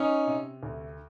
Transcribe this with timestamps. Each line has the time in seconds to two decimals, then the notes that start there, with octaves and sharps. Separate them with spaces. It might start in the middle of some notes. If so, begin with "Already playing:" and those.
Already playing: C#4 D#4
0.27 C3
0.63 D2